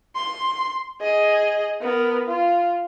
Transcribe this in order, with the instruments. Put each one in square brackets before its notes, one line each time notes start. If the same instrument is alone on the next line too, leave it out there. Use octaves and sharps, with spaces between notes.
[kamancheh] C6
G#4 D#5
B3 A#4
F4